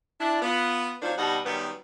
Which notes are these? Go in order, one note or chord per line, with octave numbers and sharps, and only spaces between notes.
D4 E4
B3 F4
D#3 F#3 C4 D4 F4 C5
G2 B2 G3 D#4 D#5 F#5
F#2 D#3 G3 B3